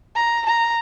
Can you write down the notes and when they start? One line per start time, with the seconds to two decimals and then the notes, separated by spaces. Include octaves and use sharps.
0.16 A#5
0.46 A#5